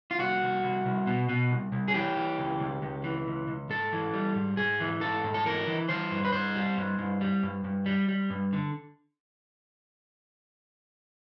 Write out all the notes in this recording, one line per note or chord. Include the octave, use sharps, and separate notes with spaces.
F4
C2 F#4
C2
C2
C2
B2
B2
C2
C2
G#4
E3 G4
E3
C#2
C#2
C#2
E3
C#2
C#2
G#2 A4
E3
G3
G#2
G#2 G#4
E3
G#2 A4
G#2
A4
E3 A#4
E3
E3 C5
G2
B4
G2 C5
G3
G2
G2
G3
G2
G2
G3
G3
G2
D3